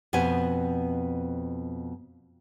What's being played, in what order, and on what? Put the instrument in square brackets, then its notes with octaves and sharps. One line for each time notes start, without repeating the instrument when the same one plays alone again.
[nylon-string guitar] F2 B2 B3 C4 G#5